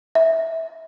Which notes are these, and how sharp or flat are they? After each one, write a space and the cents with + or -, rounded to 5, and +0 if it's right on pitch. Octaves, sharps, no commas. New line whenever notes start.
E5 -15